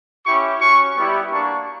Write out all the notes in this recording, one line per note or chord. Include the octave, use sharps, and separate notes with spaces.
C#4 E4 G4 C#6
C#4 F#4 C#6
G3 B3 E4 G4
A#3 D4 F#4 C#6